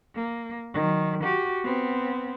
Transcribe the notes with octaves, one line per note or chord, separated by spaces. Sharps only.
A#3
D#3 F#3
F#4 G4
B3 C4